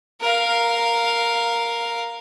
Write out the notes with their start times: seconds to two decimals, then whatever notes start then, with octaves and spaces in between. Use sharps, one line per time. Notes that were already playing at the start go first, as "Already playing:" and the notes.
0.21 A#4 F5